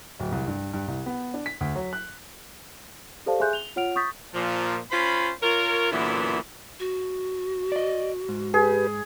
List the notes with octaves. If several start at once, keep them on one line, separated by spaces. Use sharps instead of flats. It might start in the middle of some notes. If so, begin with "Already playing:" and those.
D1
C2
G2
G2
C2
B3
D4
B6
D2
F#3
F#6
G4 A4 C5 D5 F5 A5
G#4 E5 G#5 C6 F#6 G6
F7 G7
F4 C#5 F#5 F6 D7 F7
C#6 D#6 G6 A6 B6
A#2 F3
C#4 F4 C5 B5
F4 A#4 C#5
F#2 A#2 D3 E3 B3 E4
F#4
D5 D#5
G#2
G4 G#4 B4